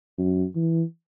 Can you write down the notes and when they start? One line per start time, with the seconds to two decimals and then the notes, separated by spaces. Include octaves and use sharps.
0.18 F#2
0.56 E3